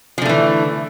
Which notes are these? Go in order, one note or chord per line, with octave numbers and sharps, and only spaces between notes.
D3 E3 F3 A3